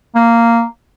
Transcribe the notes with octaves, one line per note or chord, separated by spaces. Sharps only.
A#3